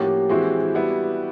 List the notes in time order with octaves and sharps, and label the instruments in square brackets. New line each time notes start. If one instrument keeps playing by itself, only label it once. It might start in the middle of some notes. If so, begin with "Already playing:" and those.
Already playing: [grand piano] A2 F3 A#3 C#4 F#4 [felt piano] G4
[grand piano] E3 G#3 C4 E4 [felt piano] F#4
[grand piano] G3 B3 E4